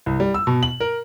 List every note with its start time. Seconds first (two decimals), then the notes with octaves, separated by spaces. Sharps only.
0.06 C2
0.20 G3
0.34 E6
0.47 B2
0.63 F#7
0.80 A#4